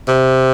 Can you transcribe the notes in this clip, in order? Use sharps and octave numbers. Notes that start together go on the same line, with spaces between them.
C3